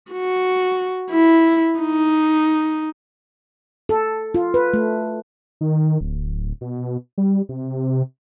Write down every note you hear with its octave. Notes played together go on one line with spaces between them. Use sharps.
F#4
E4
D#4
A4
F4
B4
A3
D#3
D1
B2
G3
C3